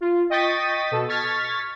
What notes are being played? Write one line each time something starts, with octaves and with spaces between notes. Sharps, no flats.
F4
D#5 G5 C#6 A6 B6 D#7
B2 A4
C#6 F6 G#6 A6 B6